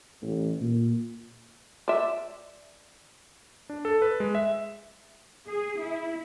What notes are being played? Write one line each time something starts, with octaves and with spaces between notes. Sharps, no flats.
A1
A#2
D5 E5
D4
A4
B4
G#3
E5
G#4
E4